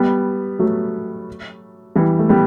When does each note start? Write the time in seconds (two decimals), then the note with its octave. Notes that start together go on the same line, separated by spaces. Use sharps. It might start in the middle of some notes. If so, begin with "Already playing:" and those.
Already playing: G3 B3
0.59 F#3 A3
1.96 E3 G3
2.19 A3
2.29 G3 B3